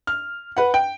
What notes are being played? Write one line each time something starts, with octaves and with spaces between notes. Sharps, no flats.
F6
B4 F#5
G5